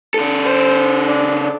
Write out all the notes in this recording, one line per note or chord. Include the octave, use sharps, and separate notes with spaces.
C#3 A4
C5
D4